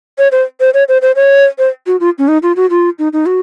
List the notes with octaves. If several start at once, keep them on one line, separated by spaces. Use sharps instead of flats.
C#5
C5
C5
C#5
C5
C5
C#5
C5
F#4
F4
C#4
D#4
F4
F#4
F4
D#4
D#4
F#4